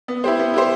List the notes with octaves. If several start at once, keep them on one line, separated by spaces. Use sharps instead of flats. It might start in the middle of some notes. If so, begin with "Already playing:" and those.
B3
E4 G4 C5
B3
E4 G4 C5